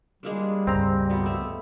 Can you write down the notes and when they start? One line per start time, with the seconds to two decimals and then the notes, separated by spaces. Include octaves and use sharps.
0.23 G3 G#3 A#3 D4
0.67 C#2 G2 C4 A#5
1.09 B2 A#3 B3
1.26 A3